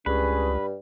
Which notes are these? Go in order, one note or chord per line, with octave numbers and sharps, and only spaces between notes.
C#2 G2 C#4 G#4 B4